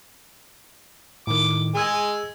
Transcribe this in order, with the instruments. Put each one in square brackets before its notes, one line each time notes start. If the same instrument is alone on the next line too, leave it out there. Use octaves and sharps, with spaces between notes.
[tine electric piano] A2 D#3 [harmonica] D6
[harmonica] G#3 G#5 [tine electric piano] G#4 E6 G#6